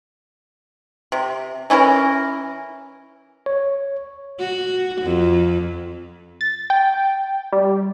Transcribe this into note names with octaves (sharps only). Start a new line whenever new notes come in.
C3
E3 C#4 E4 A#4
C#5
F#4
F2
A6
G5
G3